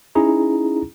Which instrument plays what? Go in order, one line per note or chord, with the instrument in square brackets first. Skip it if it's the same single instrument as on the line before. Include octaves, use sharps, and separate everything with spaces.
[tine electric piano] C#4 D#4 E4 G#4 A#5